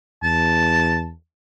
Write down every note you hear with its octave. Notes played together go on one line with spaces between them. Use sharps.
E2 A5